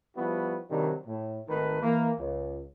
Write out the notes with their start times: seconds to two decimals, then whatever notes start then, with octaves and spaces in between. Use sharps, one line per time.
0.16 F3 G3 B3 E4 F#4
0.70 C3 D#3 F#3 G3 D4
1.07 A2
1.48 G#1 D#3 A3 D#4 B4
1.82 E3 A#3
2.19 C#2